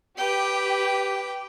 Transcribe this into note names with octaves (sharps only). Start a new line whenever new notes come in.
G4 B4 G5